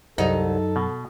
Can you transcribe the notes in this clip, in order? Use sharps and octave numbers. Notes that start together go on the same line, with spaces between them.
C2 F#2 F#3 D#4 A4
B2